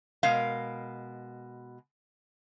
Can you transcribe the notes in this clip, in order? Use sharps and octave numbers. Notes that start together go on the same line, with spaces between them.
B2 G#3 A#4 F5